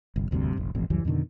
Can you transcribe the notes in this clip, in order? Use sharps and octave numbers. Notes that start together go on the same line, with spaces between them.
G1 C2
E1 D2 G2 C3
F1 A#1
E1 A1 F2
C#2 F#2 E3 G3
F2 B2 D3 D#3